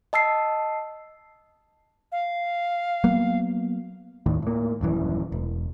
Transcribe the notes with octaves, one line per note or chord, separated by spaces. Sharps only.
D#5 A5 E6 C7
F5
F#3 A#3 B3
D#2 A2 D#3
A2 A#3
D#1 F#2 E3
E1